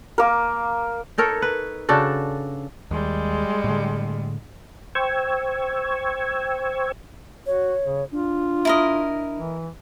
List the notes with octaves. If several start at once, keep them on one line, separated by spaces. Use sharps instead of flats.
A#3 A#4
D#4 A4 A#4 C#5
B4
C#3 D4 F#4 A4
D#2 G3 G#3
A2 D3
C5 G5 C#6 E6 G#6
F#4 C#5
C#3
D4 F4
E4 A#4 D#5
E3